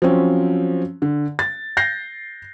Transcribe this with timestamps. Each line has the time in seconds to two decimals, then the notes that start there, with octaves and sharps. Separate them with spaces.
0.02 F3 F#3 C4 C#4
1.02 D3
1.39 A6
1.77 G6 A#6 C7